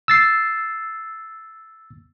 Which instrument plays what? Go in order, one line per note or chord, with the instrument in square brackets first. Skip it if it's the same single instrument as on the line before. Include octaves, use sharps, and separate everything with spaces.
[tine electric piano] E6 A6 C7